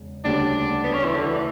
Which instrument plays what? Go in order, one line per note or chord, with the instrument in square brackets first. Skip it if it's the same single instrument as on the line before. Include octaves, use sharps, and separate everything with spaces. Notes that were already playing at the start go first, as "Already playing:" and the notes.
Already playing: [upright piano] E1 C#3
[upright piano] D2 C#3 G3 [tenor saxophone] D4
[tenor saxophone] B3
C#4
E3
D3
E3